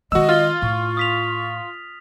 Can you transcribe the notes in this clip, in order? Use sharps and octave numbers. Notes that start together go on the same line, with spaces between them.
D#3 G#3 F#4 D#5 E6
F4 F6 A6 G7
A2 C#6
D#6 B6 F7